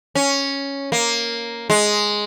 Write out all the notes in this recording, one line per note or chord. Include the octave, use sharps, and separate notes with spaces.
C#4
A#3
G#3